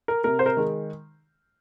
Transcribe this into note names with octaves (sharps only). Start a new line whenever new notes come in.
A#4
C3 A#4
C5
A#4
D#3 G#3